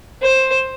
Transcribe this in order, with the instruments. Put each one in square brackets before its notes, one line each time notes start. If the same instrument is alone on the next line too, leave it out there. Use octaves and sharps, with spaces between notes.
[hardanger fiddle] C5